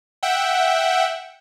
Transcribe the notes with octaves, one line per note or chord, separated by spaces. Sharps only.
E5 F#5 G5